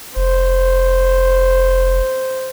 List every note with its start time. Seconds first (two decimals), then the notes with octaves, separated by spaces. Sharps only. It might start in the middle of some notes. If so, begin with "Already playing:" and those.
0.16 F1 C5